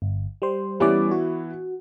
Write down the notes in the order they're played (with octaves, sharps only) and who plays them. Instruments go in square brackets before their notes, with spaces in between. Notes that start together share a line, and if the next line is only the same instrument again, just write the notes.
[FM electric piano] G1
G3 C5
[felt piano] E3 B3 E4 [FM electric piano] G3 C#4 D5
[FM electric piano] F#4